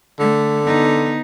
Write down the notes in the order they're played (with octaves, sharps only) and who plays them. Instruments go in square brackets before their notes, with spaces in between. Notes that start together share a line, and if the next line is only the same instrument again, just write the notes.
[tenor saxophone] D3 [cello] A3
[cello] B3 D#4